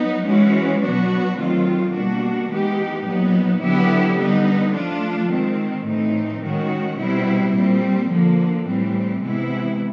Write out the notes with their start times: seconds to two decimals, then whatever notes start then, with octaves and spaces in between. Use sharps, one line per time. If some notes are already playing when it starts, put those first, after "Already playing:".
Already playing: F#3 B3 D#4
0.25 E3 G#3 C#4 F#4
0.82 B2 F#3 B3 D4 F#4
1.38 D#3 F#3 A3 C4 F4
1.93 B2 G3 A#3 D4 F#4
2.49 E3 G#3 B3 D#4 G4
3.06 A#2 F#3 B3 D#4
3.62 D3 F#3 B3 E4 G4
4.17 D3 G3 B3 D#4
4.74 F3 A3 D4 F4
5.30 D#3 G#3 C4
5.85 A2 E3 A3 C4 D#4
6.41 D#3 G#3 C#4 F#4
6.98 B2 G3 C4 E4
7.54 A#2 G3 C4
8.10 D3 F3 A#3
8.66 A2 E3 G3 C4
9.22 C3 E3 G#3 B3 E4